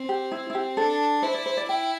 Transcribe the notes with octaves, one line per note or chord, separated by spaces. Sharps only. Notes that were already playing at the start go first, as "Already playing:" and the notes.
Already playing: C4
G4
E4
E4
G4
D4 A4
E4 C5
D5
C5
D5
E4 G5